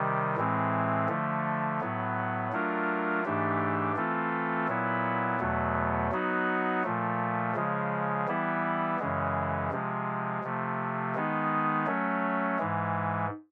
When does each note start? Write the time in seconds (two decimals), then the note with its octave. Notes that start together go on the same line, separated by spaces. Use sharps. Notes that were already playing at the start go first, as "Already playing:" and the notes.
Already playing: C3 D#3 G3
0.36 A2 E3 G#3 C4
1.08 D3 F3 A3
1.80 A2 F#3 B3
2.52 F#3 A3 D4 F4 A#4
3.24 G#2 E3 A3 D4 G4
3.96 E3 A3 C4 F4 A4
4.68 A#2 F#3 B3 E4
5.39 E2 B2 F#3 A3
6.11 F#3 B3 D#4 F#4
6.84 A#2 F3 A3
7.55 C#3 F3 G#3
8.27 E3 G3 B3 E4
8.99 F#2 C#3 E3 G#3
9.71 C3 F3 G#3
10.43 C3 F3 A3
11.15 D#3 G#3 B3 D#4
11.86 F#3 A3 C#4
12.59 G#2 E3 G#3